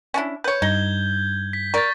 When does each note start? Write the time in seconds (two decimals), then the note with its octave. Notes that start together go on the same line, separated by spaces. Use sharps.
0.14 C#4 D4 E4
0.44 B4 C#5 G6
0.62 G2 D#4 G6 G#6 G7
1.53 B6
1.74 A#4 D5 C#6 A6